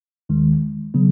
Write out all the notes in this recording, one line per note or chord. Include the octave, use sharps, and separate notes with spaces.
D#2 D#3 G#3
C#3 F#3 B3